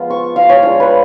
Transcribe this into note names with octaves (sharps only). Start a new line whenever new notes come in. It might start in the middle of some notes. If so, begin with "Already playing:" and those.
Already playing: F3 G#3 B3 F4
C#6
F5
C#5
G#3 D4 F4 C#5
B4